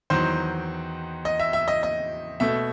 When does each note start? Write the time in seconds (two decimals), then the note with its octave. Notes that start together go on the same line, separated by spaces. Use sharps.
0.10 E2 D#3 F#3 C5
1.25 D#5
1.40 E5
1.53 E5
1.68 D#5
1.83 D#5
2.40 B2 A3 E5